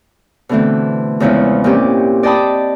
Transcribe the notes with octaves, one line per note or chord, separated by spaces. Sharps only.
B2 D3 E3 A3 C4
E2 C#3 F3 G#3 E4
A#2 C4 C#4 G4 D5
D5 D#5 G5 A5 B5 D#6